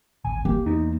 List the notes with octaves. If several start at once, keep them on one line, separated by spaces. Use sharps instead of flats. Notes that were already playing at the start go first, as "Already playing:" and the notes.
D1 G#1 G#5
A#3 G4
E2 D#4